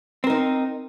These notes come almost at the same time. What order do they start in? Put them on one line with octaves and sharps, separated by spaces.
C4 A#4 D#4